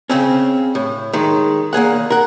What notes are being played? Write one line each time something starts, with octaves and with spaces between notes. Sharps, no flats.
C#3 C4 C#4
A2
D#3 G#3
E2 A#3 G#4 F#5
A#4 F#5